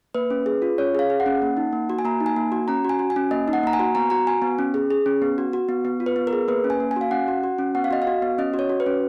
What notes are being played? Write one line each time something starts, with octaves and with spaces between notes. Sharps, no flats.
A#3 B4
C#4
G#4
F4
C#4 C#5
G#4 F5
G#4
F#5
C#4
A#3
D#4
A#3
F#4
G#5
A#3 A#5
D#4
G#5
A#3
F#4
C#4 A#5
F#4 G#5
F#4
G#5
C#4
A#3 D#5
D#4
F#5
A#3 A#5
G#5
F#4
B3 A#5
F#4 A#5
F#4 G#5
B3
C#4
G#4
G#4
C#4
B3
F#4
F#4
B3
B3
F4
B4
B3
A#4
G#4
A#3 B4
C#4
G#5
A#3
G#5
F#4 F5
C#4 F#5
F#4
F#4
C#4
B3 F#5
F5
F#4 D#5
F5
F#4
B3
C#4 D#5
F#4
C#5
F#4
B4
C#4